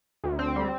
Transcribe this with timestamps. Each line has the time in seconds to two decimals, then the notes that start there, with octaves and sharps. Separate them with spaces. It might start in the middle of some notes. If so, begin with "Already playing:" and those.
0.24 D2
0.39 C4
0.56 G3